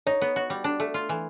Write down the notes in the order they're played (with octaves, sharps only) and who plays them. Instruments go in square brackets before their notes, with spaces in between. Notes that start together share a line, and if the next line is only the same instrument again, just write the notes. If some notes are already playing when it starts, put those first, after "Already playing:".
[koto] D#4 [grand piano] C#5
[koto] B3
F#4
G3
D4
A3
F4
E3